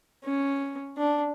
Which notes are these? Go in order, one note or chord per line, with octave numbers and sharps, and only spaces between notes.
C#4
D4